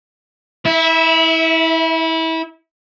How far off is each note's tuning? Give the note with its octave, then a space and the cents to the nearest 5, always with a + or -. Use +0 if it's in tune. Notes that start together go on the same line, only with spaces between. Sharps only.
E4 -25 E5 +0